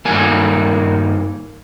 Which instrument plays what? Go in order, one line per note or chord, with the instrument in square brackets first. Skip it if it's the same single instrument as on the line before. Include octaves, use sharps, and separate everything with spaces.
[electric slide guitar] G2 D#3 G3 A#3 G#5